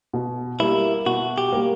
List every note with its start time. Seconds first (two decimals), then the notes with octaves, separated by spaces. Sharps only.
0.13 B2
0.60 G3 A#3 E4
1.06 B2 F#4
1.38 G4
1.53 G3 A#3